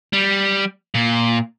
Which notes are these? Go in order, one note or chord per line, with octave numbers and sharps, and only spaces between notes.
G3
A#2